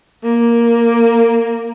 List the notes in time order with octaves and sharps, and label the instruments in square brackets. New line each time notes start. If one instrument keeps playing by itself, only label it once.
[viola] A#3